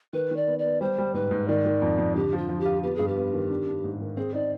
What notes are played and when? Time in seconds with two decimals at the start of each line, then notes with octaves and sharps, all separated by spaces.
0.13 D#3 B4
0.31 D#3
0.36 D5
0.47 B3
0.59 D5
0.65 B3
0.81 G3 C5
0.98 G3
1.14 G#2 B4
1.31 G#2
1.48 D#3 D5
1.66 D#3
1.82 F2
1.98 F2
2.15 D3 G4
2.33 F3 F4
2.49 F3
2.60 G4
2.65 F4
2.83 B3 G4
2.96 G2 G#4
3.08 G4
3.16 B3
3.34 D#3
3.51 D4
3.67 D4
3.84 G#2
4.01 D#3
4.17 C4 G#4
4.34 D#4 D5